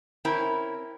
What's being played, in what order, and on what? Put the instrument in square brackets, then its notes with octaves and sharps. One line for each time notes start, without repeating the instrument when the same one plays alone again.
[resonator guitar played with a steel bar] C4 C#4 E4 A#4